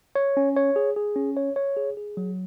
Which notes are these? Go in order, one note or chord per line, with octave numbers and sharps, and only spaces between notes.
C#5
C#4
C#5
G#4
G#4
C#4
C#5
C#5
G#4
G#4
F#3